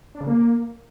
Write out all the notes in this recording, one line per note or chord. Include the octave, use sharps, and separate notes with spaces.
D4
C#3
A#3